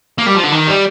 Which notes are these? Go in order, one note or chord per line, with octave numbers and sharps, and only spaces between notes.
A#3
G3
F3
D3
D#3
G3